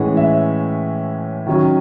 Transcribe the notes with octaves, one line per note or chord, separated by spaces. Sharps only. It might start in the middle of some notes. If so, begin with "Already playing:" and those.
Already playing: A2 E3 G#3 C#4 F#5
E5
D#3 F#3 C#4